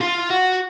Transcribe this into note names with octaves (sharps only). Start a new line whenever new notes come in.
F4
F#4